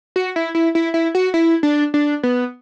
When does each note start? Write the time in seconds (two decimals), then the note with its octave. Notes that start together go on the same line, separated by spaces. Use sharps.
0.16 F#4
0.36 E4
0.55 E4
0.75 E4
0.94 E4
1.15 F#4
1.34 E4
1.63 D4
1.94 D4
2.23 B3